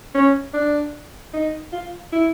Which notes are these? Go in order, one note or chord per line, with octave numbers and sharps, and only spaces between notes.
C#4
D4
D#4
F4
E4